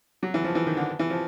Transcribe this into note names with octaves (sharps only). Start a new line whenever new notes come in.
F#3
E3
F3
E3
D#3
D3
E3
F3